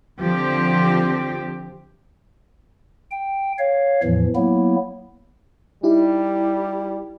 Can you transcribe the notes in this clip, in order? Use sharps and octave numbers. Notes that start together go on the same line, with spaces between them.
D3 F3 C4 G4
G5
C#5 F5
E2 A2 E3 F3
F#3 A#3 B3 E4
G3 D#4 E4 G4